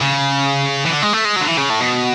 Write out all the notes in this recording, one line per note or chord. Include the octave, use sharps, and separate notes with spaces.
C#3
E3
D3
G#3
A3
G#3
D3 F#3
E3
C#3
A2
B2